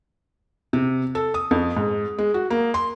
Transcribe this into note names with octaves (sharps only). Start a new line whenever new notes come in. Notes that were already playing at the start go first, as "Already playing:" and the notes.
C3
A4
D#6
F2
G#2
G#3
F#4
A#3
C6